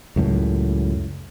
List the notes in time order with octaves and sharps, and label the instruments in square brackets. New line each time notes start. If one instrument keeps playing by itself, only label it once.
[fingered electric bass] C#2 F#2 A2